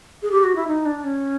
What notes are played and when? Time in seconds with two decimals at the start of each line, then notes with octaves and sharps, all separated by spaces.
0.23 G#4
0.32 G4
0.44 F#4
0.56 E4
0.68 D#4
0.85 D4
1.04 C#4